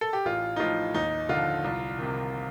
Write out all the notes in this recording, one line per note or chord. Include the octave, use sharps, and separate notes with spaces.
A4
G4
A1 F4
D#4
A2 F3 F4
D#2 D#4
D3 F3 F4
C2
C3 D#3